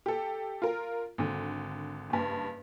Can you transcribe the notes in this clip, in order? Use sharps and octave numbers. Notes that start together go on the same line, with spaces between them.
G4 A4
F4 A#4
G#1 D3
F#1 G2